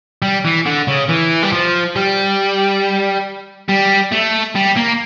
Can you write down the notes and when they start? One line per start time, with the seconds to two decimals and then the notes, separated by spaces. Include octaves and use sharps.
0.22 G3
0.45 E3
0.66 D3
0.88 C#3
1.09 E3
1.43 G3
1.52 F3
1.96 G3
3.69 G3
4.12 A3
4.55 G3
4.76 A#3